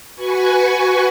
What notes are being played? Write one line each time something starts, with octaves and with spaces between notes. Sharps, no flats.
F#4 B4 G#5 C#6